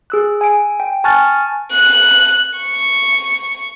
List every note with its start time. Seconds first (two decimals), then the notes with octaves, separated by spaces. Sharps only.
0.10 G#4 E6 F#6
0.41 G#5 D7
0.80 G5
1.04 G#5 A5 C#6 F6 F#6 A6
1.73 F#6
2.59 C#6